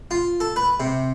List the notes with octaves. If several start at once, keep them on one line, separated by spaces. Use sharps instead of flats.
F4
A4
B4
C3